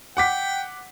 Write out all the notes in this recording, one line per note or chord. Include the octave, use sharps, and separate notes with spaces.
F#5 G5 D6 B6